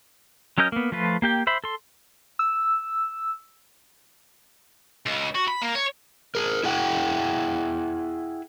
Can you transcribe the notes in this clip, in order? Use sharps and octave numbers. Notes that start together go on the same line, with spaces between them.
F#3 C#4 A#4 D#5 G6
A#3 B3
F3 A3 F4 B4
A#3 G4 G5
C5 E5 B5
A4 C6
E6
C#2
F#4
B5
A#3
C#5
G#4 A#4
E4 G#4 F#5 G5